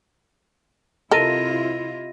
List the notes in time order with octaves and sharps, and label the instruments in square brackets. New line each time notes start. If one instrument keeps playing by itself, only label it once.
[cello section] C3 E4 F4 [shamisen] A4 A#4 [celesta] D#5 A#6 D#7